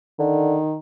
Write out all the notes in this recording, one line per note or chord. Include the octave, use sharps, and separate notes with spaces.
D3 D#3